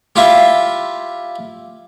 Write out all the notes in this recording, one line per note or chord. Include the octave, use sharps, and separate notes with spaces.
E4 F4 G4